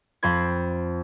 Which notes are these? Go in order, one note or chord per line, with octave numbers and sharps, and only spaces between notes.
F2 C4 C5 B5 G#6